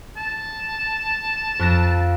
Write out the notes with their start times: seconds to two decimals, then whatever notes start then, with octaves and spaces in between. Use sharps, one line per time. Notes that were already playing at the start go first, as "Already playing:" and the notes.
0.17 A5
1.59 F2 F#6 A#6